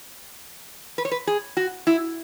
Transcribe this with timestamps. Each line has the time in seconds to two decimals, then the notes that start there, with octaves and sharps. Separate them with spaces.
0.98 B4
1.05 C#5
1.12 B4
1.27 G#4
1.57 F#4
1.87 E4